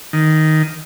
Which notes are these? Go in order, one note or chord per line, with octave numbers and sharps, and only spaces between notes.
D#3